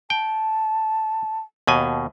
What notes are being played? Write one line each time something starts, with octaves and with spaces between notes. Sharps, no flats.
G5 A5
D#2 B2 G#5